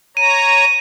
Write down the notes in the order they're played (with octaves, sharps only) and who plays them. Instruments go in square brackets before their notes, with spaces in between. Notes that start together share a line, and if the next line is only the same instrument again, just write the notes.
[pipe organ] C#5 A#5 [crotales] D#7